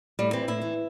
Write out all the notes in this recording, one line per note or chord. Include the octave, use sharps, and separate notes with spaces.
A2 G3
E3 C4
A2 E4
E3